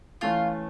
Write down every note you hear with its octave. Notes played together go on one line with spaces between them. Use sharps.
E3 A3 C#4 F4